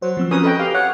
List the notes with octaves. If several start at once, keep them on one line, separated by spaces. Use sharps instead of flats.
F#3 C5
F3 C4 E6
C#4 A#4 B4 D#6
A4 B4 D#5 G5
G4 F5
C#5 F#5